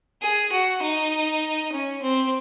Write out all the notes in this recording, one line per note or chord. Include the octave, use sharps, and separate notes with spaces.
G#4
F#4
D#4
C#4
C4